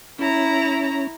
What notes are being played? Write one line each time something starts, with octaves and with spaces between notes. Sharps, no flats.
C#4 E4 A#5